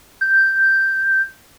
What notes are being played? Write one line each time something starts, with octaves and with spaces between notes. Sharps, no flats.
G6